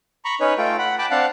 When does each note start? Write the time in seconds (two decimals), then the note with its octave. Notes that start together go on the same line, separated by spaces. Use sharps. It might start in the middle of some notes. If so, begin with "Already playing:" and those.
0.25 A#5 B5 C#6
0.40 C#4 D#4 B4 C#5
0.58 A3 F4 A4 G5
0.78 F#5 B5
0.98 G5 A5 B5 D6
1.11 C4 D4 F5 F#5 A5